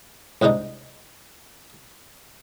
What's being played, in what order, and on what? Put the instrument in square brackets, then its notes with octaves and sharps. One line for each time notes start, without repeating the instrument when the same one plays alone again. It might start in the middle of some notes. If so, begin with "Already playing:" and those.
[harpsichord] C2 G#2 C3 D4 D#4